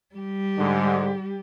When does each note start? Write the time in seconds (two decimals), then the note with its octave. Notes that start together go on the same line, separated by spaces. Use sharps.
0.15 G3 G4
0.58 G#2 D3